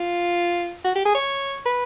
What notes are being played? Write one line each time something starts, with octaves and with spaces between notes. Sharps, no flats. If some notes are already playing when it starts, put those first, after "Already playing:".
Already playing: F4
F#4
G4
G#4
C#5
B4